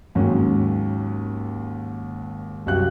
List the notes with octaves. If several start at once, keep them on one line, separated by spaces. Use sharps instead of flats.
D#2 G#2 F#3 C#4
C2 F#2 F#4 G4 F5 F#6